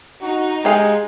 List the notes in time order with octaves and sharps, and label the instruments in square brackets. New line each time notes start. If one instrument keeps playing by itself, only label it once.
[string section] D#4 [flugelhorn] F#4
[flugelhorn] G#3 [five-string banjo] G4 G#4 F5